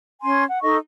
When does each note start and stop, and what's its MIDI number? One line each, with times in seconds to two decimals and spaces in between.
0.22 0.44 61
0.22 0.44 80
0.22 0.44 84
0.47 0.61 78
0.61 0.77 63
0.61 0.77 69
0.61 0.77 75
0.61 0.77 85